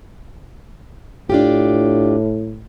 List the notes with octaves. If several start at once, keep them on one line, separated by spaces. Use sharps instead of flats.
A2 D4 F4 G4